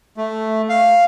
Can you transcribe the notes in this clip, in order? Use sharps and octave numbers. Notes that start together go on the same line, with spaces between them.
A3
F5